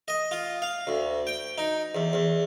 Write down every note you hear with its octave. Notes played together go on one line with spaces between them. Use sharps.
D#5
F4
F5
D2
G5
D#4
E2
E2